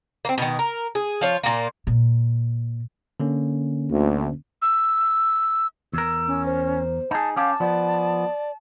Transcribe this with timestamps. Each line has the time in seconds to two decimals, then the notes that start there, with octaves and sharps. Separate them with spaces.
0.25 A#3 C4
0.38 B2 D#3
0.59 A#4
0.95 G#4
1.21 F3 F4 C#5
1.43 A#2 A#3
1.87 A#2
3.20 D3 A#3 C#4
3.90 D2
4.62 E6
5.93 E2 A#4 E6
6.27 C#4
6.46 C5
7.11 D#4 G#4 A5
7.36 C#4 G4 F5 A5
7.60 F3 B3 D5